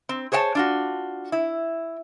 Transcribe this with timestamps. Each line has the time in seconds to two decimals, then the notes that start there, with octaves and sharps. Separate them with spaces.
0.09 C4
0.32 G#4 C5 C#5 F#5 A5
0.55 D4 F4 F#4
1.32 E4